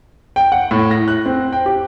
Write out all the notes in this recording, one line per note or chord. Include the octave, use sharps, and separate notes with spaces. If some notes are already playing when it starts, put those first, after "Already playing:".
G5
F#5
A2
A#6
F#6
C4
G5
G4